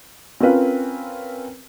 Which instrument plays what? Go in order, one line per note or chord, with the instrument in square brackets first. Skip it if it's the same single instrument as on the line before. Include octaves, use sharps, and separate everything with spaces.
[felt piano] C4 C#4 F4 A#4 B4 F5